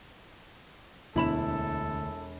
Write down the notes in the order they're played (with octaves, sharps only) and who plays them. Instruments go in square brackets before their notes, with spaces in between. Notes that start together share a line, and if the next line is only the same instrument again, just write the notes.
[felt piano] E1 E7 [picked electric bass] D2 [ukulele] E4 B5 [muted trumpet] A4